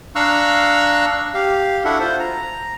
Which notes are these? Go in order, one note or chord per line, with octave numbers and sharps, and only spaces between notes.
D4 F5 A#5 C#6 E6 F#6
G4 F5
D4 E4 F#4 A4 E5 F#5
F4 C5
A#5